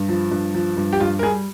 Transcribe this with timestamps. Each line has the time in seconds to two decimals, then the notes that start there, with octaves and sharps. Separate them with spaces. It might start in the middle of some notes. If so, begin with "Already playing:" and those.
Already playing: G2
0.09 F3
0.31 G2
0.54 F3
0.77 G2
0.93 G4
1.00 G2 F4
1.19 A#4
1.23 G3 G#4